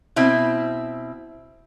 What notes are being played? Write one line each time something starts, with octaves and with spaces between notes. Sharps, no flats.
B2 C4 E4